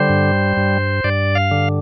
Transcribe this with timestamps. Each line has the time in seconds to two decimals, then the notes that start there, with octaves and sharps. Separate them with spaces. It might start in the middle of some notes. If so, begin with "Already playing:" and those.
Already playing: D3 G3 C5
0.09 G2
0.57 G2
1.04 G2 D5
1.35 F5
1.51 D3